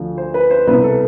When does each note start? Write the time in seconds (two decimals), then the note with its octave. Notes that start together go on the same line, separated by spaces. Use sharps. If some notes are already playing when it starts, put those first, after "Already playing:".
Already playing: D2 D3 F3
0.18 C5
0.34 B4
0.51 C5
0.67 C2 B2 B4
0.84 A4